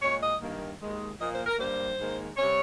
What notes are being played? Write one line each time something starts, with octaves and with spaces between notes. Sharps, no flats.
A#2 G#3 C#5
D#5
G2 D#3 A#3
D#2 D#3 G#3
A#2 F3 A#3 D#5
C5
A#4
G2 G3 A#3 C5
G#2 D#3 A#3
C3 G3 C#5